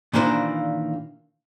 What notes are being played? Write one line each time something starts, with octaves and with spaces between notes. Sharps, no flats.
A#2 D#3 E3 A#3 D4 C5